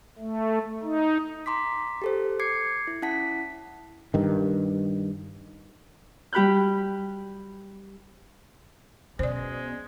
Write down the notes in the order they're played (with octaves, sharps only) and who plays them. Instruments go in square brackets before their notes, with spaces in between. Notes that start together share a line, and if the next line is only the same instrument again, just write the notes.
[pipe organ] A3
D#4
[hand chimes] A#5 C6 D6 B6
G4 A4 C5
D6 G#6 C7 C#7
E4
C#4 E4 F#5 A5 B6
[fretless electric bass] G2 D#3
[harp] G3 G4 B5 F#6 G6
[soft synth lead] B2 [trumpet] G#3 [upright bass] C#4 [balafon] C5 D5